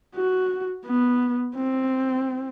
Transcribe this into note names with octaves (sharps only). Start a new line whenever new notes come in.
F#4
B3
C4